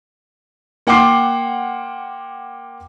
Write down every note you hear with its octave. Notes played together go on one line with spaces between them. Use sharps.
A#3 F#5 G5 C6 D6 C7